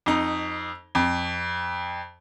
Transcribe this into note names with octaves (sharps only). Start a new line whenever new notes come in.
F2 D#4
F2